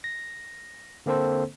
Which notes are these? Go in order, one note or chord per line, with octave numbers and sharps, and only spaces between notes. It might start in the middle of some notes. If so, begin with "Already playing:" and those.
A#6
D3 A#3 C4 A4 C5